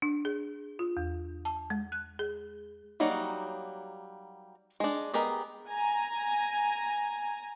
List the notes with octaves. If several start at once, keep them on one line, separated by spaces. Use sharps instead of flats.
D4
G#4
F4
E2
A5
G#3
F#6
G#4
F#3 G3 A#3 D#4 F#4
G#3 D4
B3 G4 G#4 A#4 D#5
G#5 A#5